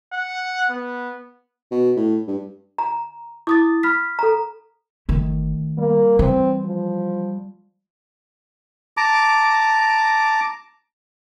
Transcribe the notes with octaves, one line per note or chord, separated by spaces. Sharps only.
F#5
B3
B2
A2
G2
A#5
E4 D6 D#6 A6
B5 F6 B6
A4 A#5
G1 D#3 A3
G3 A#3
E3 C4
F3
A5 A#5 D6